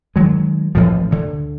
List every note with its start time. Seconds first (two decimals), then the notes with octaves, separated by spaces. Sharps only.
0.16 D#3 F#3 G#3
0.75 A1 A2 F3
1.11 D2 D3